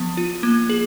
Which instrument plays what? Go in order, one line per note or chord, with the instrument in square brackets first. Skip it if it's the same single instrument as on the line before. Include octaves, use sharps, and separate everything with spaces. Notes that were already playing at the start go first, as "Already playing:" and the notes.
Already playing: [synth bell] F3 B3
F4
A#3
G#4